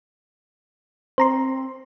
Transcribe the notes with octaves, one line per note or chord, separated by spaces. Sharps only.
C4 C5 A#5 C6